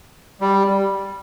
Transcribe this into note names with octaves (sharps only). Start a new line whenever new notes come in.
G3